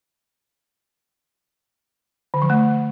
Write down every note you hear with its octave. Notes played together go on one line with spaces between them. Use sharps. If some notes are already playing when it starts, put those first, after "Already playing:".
D3
F3
A3